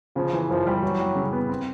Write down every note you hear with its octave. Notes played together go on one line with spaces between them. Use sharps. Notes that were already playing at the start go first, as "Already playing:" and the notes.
C#3 F3
E3
F#2 F3
G3
E3 F#3
G3
C#3
B3
C4